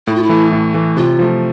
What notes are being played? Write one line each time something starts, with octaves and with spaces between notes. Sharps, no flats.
A2 E4
F4
E4
E3 A3
A2
E3 A3
C3 F4
F3 A3